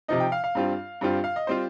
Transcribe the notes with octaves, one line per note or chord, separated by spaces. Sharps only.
C3 F3 D#4 D#5
G5
F5
F5
G2 G3 C4 F4
G2 G3 C4 F4
F5
D#5
G3 C4 F4 C5